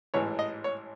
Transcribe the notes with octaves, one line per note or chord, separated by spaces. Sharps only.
A1 G#2 E3 C#5
D#5
C#5